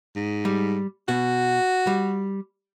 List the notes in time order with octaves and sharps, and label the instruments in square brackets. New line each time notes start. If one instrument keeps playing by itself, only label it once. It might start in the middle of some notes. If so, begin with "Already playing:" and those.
[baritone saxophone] G#2
[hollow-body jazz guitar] G3
[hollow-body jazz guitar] B2 [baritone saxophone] F#4
[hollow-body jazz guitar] G3